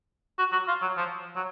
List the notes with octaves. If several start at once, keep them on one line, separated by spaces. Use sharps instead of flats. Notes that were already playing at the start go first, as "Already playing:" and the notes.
F#4
F#4
F4
F#3
F3
F#3